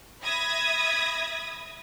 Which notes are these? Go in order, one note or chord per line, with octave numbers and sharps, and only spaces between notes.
E5 B5 D#6 G#6 A#6